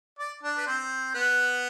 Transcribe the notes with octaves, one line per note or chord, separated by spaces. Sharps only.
D5
D4 D5
B4
C4 C5
B3 B4